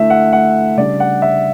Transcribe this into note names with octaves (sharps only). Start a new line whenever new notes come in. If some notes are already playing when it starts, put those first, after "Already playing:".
Already playing: D3 A3 E4 E5
F#5
F#5
C#3 G3 D4 D5
F#5
E5